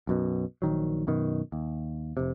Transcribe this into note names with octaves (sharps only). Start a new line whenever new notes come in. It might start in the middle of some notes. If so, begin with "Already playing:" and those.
B1 F#2 B2
A#1 D#3 F#3
F#2 B2 D#3
D#2
F1 C3